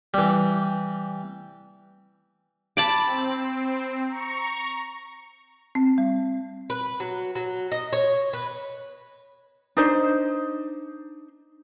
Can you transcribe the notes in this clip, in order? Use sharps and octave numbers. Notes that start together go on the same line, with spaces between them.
E3 G3
A5 B5 D6
C4
A#5 C#6 C#7
C4
G3
B4
F#3
F#3
D#5
C#5
B4
D4 D#4 C5